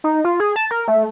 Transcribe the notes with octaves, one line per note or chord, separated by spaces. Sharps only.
D#4
F4
G#4
A5
A#4
A3